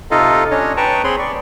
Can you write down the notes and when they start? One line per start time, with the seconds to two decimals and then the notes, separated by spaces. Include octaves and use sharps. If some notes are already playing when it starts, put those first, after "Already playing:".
0.11 C3 D#4 F4 A4 D#5 F5
0.51 C#4 D4 C#5 D#5
0.77 B4 G5 A5 A#5 C#6
1.04 C4 G#4 C#5 B5 C6
1.19 D5 C#6